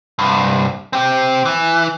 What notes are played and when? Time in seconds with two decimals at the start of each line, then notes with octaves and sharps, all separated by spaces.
0.19 C2 G2
0.93 C4 G4
1.45 E3